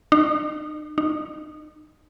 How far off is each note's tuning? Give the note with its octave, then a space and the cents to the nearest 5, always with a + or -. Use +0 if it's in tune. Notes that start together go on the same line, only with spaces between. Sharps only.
D#4 -45
D#4 -30